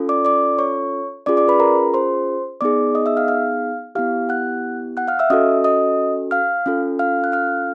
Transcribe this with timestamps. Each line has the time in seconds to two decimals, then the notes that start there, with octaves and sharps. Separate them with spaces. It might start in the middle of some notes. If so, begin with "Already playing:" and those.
Already playing: C#4 F4 A4
0.09 D5 D6
0.25 D5 D6
0.59 C#5 C#6
1.26 C#4 F4 G#4 D5 D6
1.37 D5 D6
1.48 B4 B5
1.60 A#4 A#5
1.94 C5 C6
2.61 B3 D#4 G#4 D5 D6
2.95 D#5 D#6
3.06 E5 E6
3.17 F5 F6
3.28 F5 F6
3.95 B3 E4 G4 F5 F6
4.29 F#5 F#6
4.97 F#5 F#6
5.08 F5 F6
5.19 E5 E6
5.30 C#4 F#4 A4 D#5 D#6
5.64 D#5 D#6
6.31 F5 F6
6.66 C#4 F4 A4
6.99 F5 F6
7.24 F#6
7.32 F5 F6